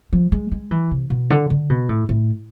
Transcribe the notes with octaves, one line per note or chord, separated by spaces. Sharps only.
F3
G#3
G#3
E3
C3
B2
D3
D3
B2
A2
A2